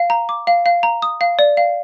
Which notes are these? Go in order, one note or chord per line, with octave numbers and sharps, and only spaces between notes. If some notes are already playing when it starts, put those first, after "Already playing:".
Already playing: F5
A#5
D6
F5
F5
A#5
D#6
F5
D5
F5